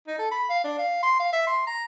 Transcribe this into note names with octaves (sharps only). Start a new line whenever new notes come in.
D#4
A4
B5
F5
D4
F5
C6
F5
E5
C6
A#5